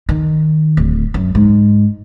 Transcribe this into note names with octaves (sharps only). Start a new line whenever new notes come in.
D#3
D1
F#2
G#2